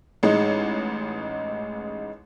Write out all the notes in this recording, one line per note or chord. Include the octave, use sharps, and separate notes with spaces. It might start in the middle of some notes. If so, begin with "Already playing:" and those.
A1 G#3 D#4